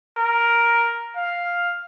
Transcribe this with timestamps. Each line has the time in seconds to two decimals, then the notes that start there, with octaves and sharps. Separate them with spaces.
0.17 A#4
1.16 F5